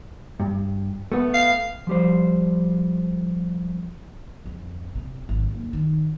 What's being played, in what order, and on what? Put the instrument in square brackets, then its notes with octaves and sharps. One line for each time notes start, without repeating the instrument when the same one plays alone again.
[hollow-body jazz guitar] G2
A3 B3
[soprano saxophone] F5
[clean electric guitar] F3 G3 C5
[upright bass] F2
C3
G#1
D#1
D#3